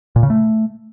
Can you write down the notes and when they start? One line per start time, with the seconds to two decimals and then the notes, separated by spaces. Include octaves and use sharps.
0.16 A#2
0.23 C#3
0.30 A3